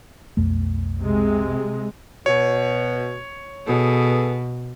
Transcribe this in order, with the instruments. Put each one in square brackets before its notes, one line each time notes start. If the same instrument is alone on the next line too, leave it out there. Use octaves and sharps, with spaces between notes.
[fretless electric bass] B1 F2 A3
[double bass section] C3 G#3
[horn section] B2 [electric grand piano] C#5
[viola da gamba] B2 [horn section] B3 G#4 A4